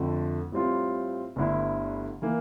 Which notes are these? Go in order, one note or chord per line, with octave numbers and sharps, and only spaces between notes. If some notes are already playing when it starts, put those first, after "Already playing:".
Already playing: F2 D3 F3 A3
A2 G3 C4 F4
G1 G2 D3 A3 E4
E3 A#3